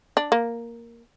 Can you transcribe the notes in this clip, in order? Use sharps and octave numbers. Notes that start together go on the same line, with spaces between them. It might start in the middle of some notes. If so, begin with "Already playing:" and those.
D4
A#3